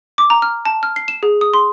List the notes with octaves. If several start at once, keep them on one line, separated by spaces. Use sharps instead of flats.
D6
A#5
F6
A5
F6
C7
E7
G#4
D#6
C6